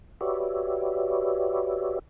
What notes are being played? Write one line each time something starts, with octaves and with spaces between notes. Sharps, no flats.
F#4 G4 B4 C#5 D5 E5